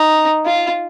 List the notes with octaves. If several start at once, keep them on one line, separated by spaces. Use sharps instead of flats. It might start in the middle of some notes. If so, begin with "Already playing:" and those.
Already playing: D#4
F4